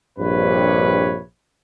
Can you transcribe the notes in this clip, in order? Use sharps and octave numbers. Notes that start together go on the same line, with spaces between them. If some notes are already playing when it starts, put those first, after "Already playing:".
A#1 G2 C3 B4 C#5